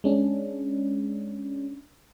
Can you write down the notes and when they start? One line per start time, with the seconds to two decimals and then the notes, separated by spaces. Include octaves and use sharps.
0.04 G#3 C#4 D4